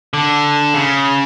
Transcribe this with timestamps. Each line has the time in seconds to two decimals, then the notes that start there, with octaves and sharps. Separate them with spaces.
0.14 D3
0.74 C#3